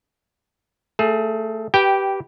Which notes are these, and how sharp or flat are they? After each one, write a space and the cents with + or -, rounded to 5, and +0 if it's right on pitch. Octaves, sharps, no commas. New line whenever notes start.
A3 +10 G#4 +35
G4 -10 B4 -5 G5 +0